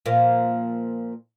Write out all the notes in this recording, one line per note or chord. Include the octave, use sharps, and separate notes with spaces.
A#2 F3 A#3